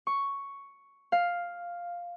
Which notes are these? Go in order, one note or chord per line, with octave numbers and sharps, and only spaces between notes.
C#6
F5